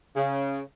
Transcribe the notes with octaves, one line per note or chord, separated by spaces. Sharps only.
C#3